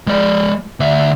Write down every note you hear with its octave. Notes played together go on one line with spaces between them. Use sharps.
G#3 D5
D2 E5